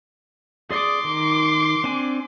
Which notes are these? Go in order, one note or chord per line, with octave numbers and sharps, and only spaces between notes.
G#4 D5 C6 D6 D#6
D#3
C4 D4 G#5